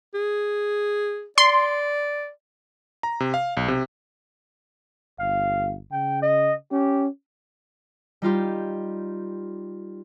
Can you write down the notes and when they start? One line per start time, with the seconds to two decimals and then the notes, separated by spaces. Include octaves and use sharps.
0.14 G#4
1.38 D5 C6
3.03 A#5
3.20 C3
3.34 F5
3.57 B1
3.68 C3
5.20 G1 F5
5.92 C#3 G5
6.22 D#5
6.72 C#4 G4
8.22 G3 D#4 F4 G4